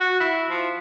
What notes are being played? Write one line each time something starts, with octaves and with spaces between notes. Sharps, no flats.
F#4
E4
F3